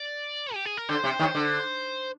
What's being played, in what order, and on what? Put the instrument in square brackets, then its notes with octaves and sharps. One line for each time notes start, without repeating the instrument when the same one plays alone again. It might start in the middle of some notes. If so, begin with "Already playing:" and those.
Already playing: [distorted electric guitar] D5
G4
G#4
A#4
[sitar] D3 [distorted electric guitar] C5
[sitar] C3
D#2 D#3
D3